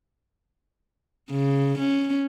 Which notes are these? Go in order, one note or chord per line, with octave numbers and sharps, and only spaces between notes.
C#3
C#4